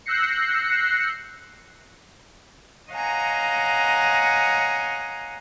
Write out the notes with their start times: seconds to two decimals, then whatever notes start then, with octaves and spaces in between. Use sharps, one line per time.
0.06 E6 F#6 G6 A#6 C7 C#7
2.91 C#5 D#5 F5 F#5 G#5 A#5